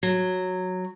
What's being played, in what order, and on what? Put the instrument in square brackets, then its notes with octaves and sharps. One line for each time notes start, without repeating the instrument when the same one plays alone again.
[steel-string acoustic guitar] F#3